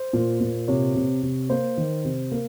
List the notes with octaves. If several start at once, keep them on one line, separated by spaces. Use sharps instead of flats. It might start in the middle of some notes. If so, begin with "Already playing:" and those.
Already playing: C5
A#2
A#2
C3 C#5
C3
C3
A#3 C5
D#3
C3
A#3 A#4